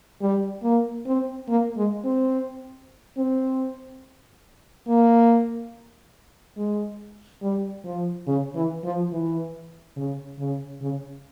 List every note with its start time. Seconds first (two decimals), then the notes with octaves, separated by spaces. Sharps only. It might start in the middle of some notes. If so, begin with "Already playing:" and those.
0.21 G3
0.63 A#3
1.06 C4
1.49 A#3
1.77 G#3
2.05 C4
3.17 C4
4.88 A#3
6.57 G#3
7.42 G3
7.84 F3
8.27 C#3
8.54 E3
8.84 F3
9.12 E3
9.96 C#3
10.39 C#3
10.81 C#3